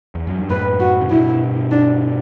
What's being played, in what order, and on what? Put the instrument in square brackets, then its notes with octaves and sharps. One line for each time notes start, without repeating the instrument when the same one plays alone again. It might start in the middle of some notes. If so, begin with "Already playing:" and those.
[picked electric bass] E2
F#2
G2
[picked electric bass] F#2 A2 [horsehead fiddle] B4
[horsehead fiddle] F#4
[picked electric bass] C#3
[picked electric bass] G2 B2 [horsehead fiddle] E4
[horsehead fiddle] D4